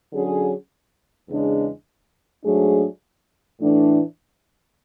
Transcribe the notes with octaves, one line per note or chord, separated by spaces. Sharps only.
D3 F#3 C#4 G#4
E2 C#3 G#3 D4
G#2 F#3 A3 D4 G#4
A2 E3 A3 D4